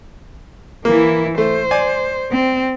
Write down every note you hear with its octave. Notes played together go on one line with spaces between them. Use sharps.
E3 A#3 E4
A3 C5
D5 G#5
C4